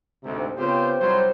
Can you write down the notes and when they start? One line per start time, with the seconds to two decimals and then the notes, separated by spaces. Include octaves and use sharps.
0.23 D2 G#2 C3
0.57 C#3 B3 C4 F4 G4 C5
1.00 C2 F#3 G3 C5